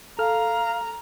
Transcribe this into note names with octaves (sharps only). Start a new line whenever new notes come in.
A4 F5 A#5 F6